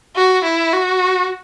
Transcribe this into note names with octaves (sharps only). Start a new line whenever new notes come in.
F#4
E4
F#4